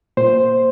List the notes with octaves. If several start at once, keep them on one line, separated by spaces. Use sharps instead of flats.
A#2 C5